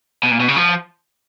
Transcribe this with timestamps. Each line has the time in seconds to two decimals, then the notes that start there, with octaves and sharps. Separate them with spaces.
0.23 B2
0.31 A#2
0.40 B2
0.48 C#3
0.56 F3